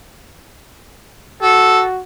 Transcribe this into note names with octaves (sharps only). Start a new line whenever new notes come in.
F#4 A4